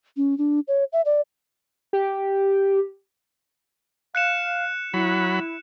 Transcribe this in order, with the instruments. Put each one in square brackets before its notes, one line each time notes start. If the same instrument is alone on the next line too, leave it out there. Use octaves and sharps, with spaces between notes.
[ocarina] C#4
D4
C#5
E5
D5
[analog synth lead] G4
[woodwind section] F5 [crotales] F#6 C#7 E7
[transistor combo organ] F#3 B5 [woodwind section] E4